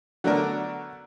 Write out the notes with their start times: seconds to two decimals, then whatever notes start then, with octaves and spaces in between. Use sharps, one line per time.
0.24 D3 F#3 A3 B3 D4 A#4